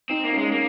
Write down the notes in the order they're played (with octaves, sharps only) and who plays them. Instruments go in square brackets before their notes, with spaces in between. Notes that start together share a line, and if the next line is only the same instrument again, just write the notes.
[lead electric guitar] C4 [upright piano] D#4
[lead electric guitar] A#3
[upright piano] C#4
[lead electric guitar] G#3
A#3